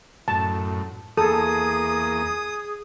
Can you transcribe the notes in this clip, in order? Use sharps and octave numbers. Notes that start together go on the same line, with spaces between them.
F#2 A2 A5
E2 A#3 G#4 A4 D#6